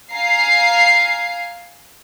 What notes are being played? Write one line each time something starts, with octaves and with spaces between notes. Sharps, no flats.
F5 G#5 A#5 C7